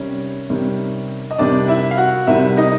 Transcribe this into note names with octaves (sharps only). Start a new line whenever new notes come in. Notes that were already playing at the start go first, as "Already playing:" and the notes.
Already playing: C3 D#3 G3 C#4 C#5
C3 D#3 G3
D#5
C3 D#3 G3 D4 D5
E4 E5
F5
F#4 F#5
C3 D#3 G3 E4 E5
D#4 D#5